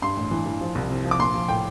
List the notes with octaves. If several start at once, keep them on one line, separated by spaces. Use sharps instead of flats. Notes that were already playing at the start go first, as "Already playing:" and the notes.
G2 C6
A1
E3
E3
F3
C2
C3
F3
D6
A#1 C6
F3
A2 G5